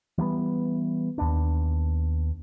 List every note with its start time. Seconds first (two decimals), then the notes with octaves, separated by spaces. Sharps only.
0.18 E3 G3 A#3 B3
1.18 D#2 B3 D4